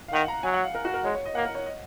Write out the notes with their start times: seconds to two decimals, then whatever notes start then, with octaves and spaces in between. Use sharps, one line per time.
0.08 F5
0.13 D#3 F#5
0.28 A#5
0.43 F#3 G#5
0.54 F#5
0.64 F5
0.75 A#4
0.85 F#4
0.94 A#4
1.04 G#3 C#5
1.15 C#5
1.25 D#5
1.35 A#3 F#5
1.45 A#4
1.55 C#5
1.66 D#5